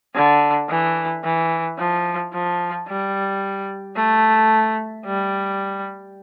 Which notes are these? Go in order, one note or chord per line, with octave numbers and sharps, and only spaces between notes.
D3
E3
E3
F3
F3
G3
A3
G3